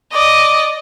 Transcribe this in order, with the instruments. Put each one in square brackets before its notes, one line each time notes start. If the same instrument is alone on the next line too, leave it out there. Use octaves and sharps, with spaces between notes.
[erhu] D5 [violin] D#5